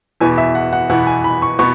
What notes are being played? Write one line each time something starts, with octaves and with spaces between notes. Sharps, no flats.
E2 B2 B3 E4 G#5
E5
F#5
F#5
E2 B2 B3 E4 F#5
G#5
B5
C#6
B2 B3 C#6